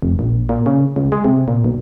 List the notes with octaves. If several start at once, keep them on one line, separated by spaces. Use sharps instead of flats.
F1
A#1
A#2
C#3
C#2
G#3
C3
A#2
B1